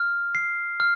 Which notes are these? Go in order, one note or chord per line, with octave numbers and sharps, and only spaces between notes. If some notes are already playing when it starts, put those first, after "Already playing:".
Already playing: F6
C7
F6